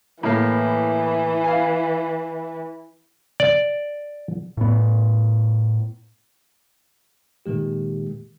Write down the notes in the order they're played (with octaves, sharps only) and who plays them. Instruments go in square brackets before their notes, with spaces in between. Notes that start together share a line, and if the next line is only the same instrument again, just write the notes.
[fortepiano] A2 A#3 [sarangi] E3
[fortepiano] F5 G#5
[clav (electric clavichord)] D5
[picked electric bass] A2 B3
[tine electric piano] A#2 D#3 G#3 G4